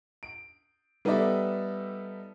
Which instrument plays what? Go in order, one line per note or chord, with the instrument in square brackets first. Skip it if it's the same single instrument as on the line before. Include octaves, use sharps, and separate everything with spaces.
[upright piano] D7
G3 B3 D#4 A4 D5 E5